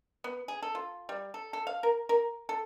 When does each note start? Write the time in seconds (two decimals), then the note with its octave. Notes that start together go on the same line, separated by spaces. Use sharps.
0.24 B3
0.48 G#4
0.62 A4
0.75 F4
1.09 G3
1.34 A4
1.53 A4
1.67 F5
1.83 A#4
2.09 A#4
2.49 A4